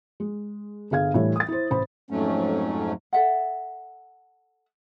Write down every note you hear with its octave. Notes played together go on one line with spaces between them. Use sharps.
G#3
G1 G#4 F5 G#6
A2 E3 G3
D#6 A6
E4 C5
A1 C5 B5
F2 G#2 F#3 A3 C#4
A4 E5 F#5